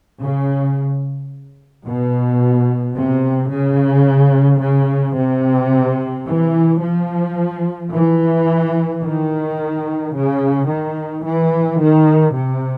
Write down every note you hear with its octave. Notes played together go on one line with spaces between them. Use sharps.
C#3
B2
C3
C#3
C#3
C3
E3
F3
E3
D#3
C#3
D#3
E3
D#3
C3